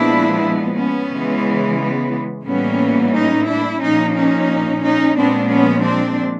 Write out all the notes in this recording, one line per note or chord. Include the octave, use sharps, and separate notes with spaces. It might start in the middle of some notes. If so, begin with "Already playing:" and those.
Already playing: A#2 F3 G#3 B3 D4 E4
B3 C#4
C#3 E3 G#3
B3
A2 E3 G3 A#3 B3 C#4
C#4 D#4
D4 E4
A#2 F3 A#3 C#4 D#4
C#4 D#4
C#4 D#4
A#2 F3 G#3 B3 C4 D4
B3 C#4
C4 D4